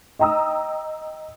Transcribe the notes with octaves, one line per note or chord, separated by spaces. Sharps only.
D#5 G5 A#5 D#6 E6